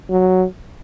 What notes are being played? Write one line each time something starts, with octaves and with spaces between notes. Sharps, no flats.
F#3